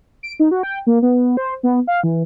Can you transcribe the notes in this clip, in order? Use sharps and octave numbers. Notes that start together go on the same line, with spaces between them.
D7
D#4
F#4
G5
A#3
B3
C5
B3
F5
E3